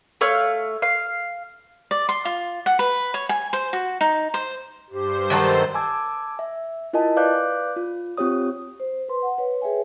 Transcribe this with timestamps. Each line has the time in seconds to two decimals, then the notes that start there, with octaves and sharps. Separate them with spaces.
0.21 A3 C#5 F5 F6
0.82 F5
1.91 D5
2.09 C6
2.25 F4
2.66 F#5
2.79 B4
3.14 C#5
3.29 G#5
3.53 C5
3.73 F#4
4.01 D#4
4.34 C5
4.90 G2 G4 C5
5.30 D#3 F#3 A4
5.74 G#5 A5 D6 E6 G#6
6.39 E5
6.93 E4 F4 A#4 D#5 G#5 A5
7.16 B4 D5 F5 D6 F#6 G6
7.76 F4
8.17 C4 F4 G4 C#5 D#6
8.80 C5
9.09 B4 C6
9.22 F#5
9.38 B4 C#5
9.62 G#4 B4 C#5 E5 G5 G#5